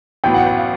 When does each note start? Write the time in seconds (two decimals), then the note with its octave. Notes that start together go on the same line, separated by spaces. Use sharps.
0.24 A1 A2 F#3 B3 G5
0.34 F#5
0.47 F#5
0.57 F5